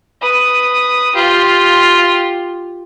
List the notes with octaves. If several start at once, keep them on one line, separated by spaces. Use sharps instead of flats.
B4 D#6
F4 G4